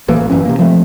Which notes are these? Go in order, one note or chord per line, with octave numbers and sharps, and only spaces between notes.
A1 E3 A#3
F#1 G2 E3 C#4
C3 A#3
F3 G#3 A3 C4